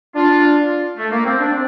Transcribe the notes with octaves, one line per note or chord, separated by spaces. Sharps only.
D4 F4
A3
A#3
C4
D4
C4